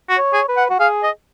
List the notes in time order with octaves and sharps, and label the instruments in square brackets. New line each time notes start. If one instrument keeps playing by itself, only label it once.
[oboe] F#4
[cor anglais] C#5
[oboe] G#4
[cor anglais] B4
[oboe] F#5
[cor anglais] F#4
[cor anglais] G#4 [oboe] F5
[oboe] D#5